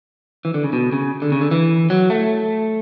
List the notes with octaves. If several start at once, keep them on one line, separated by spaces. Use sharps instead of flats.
E3
D3
C#3
B2
C#3
D3
C#3
D3
E3
F#3
A3